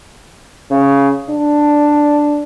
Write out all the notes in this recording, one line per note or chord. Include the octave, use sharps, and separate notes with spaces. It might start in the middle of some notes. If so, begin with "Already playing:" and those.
C#3
D4